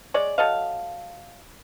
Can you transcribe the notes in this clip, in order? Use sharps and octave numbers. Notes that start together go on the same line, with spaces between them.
G#3 C#5 D5
F#3 A4 D#5 F5